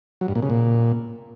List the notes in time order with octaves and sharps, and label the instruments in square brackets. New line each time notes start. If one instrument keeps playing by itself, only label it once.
[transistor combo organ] F#3
G2
A#2
C#3
A#2